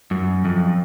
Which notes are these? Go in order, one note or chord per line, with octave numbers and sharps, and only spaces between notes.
F#2
F2